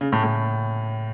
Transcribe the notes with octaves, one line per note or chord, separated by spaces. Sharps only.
C#3
A2
A2